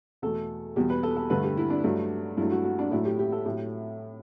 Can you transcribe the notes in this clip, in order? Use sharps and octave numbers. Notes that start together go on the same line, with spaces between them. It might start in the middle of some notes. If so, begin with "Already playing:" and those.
E2 B2 A3 A4
E2 B2 G3 G4
B4
A4
A4
G2 D3 A3 B4
G4
E4
D4
G2 F#3 A3
G2 F#3 A3 E4
F#4
F#4
D4
A2 F#3 A3 E4
G4
G4
A4
A2 F#3 A3 G4